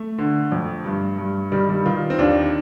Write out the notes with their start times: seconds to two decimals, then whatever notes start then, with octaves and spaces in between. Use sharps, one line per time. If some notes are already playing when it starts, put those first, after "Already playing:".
Already playing: A3
0.18 D3
0.52 F2
0.85 G2
1.18 G2
1.52 D#3 G3
1.69 G3
1.85 D#3 F4
2.10 C4
2.18 D#2 D4